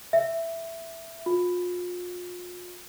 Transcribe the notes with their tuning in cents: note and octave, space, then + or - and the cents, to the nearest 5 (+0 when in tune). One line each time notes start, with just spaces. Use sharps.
E5 +5
F4 +35